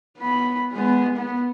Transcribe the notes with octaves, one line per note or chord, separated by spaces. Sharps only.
B3 B5
G#3 B3
B3